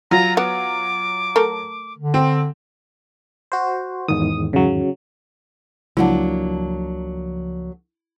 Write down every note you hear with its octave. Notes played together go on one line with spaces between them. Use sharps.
F#3 F4 A#5
B3 F#4 D6
A3 A4 A#4
D3
C4
F#4 C5
E2 G#2 D#3 D#6
C#3 F#3
C#2 F3 F#3 A#3 D4 E4 F#5